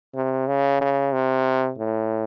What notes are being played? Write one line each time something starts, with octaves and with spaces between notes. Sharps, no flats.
C3
C#3
C#3
C3
A2